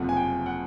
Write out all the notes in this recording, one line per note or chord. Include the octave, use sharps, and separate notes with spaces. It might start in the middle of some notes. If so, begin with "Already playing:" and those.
Already playing: F#1 F2 C3 F3 F#5
G#5
G5
F#5